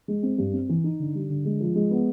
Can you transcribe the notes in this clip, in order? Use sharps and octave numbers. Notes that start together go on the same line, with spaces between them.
G#3
C4
G2
C4
E3
D#4
D3
G3
D3
G#3
F3
G#3
B3